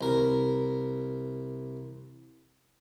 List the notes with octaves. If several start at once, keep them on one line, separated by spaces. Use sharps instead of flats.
C2 A#4